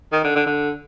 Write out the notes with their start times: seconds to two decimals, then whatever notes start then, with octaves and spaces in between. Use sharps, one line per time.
0.12 D#3
0.24 D3
0.36 D3
0.47 D3